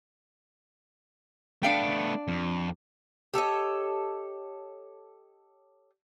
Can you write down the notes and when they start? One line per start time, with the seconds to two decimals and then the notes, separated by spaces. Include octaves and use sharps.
1.63 A3 B3 D4 F5 G5
2.28 F2
3.34 G4 A4 C#5 D#5